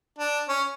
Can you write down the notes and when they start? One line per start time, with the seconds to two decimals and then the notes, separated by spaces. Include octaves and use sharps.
0.19 D4
0.48 C#4